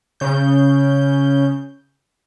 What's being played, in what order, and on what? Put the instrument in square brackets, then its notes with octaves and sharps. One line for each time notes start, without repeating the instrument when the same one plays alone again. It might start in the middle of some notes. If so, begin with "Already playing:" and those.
[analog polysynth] C#3 G6